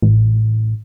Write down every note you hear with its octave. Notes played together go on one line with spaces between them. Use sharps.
A1